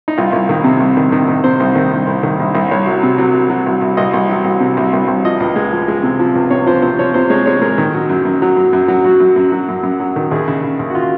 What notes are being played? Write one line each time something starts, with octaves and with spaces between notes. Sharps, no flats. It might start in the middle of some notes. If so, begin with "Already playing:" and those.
D#4
C2 F4
C2
D#3
C3
C2
D#3
D#3
D#3
C3 C5
C2
D#3
C2
C2
D#3
C2
C2
C2 C#5
F#3
C3
F#3
F#3
F#3
C2
C2
C2 D#5
C2
F#3
C2
C3
C2
C2
C2
F3 D#5
C#2
G#3
F3
G#3
C3
F3
C#2
C3 C#5
F3 C5
C3 C5
F3 C#5
C3 C5
G#3 C#5
G#3 C#5
G#3 A#4
D#3
F#3
F#2
F#2
F#3
F#2
F#2
F#3
F#2 F#4
F#2
F#2
F#3
F#2
F#2
F#3
D#3
D#2 G#4
C#3
C#3
D#2
F#4
F4